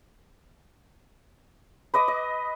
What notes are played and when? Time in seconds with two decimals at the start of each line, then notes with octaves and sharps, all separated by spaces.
1.94 B4 D#5 D6 D#6
2.08 D#5